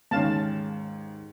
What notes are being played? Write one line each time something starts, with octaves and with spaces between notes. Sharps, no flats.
D#2 G#2 C#4 F5 A5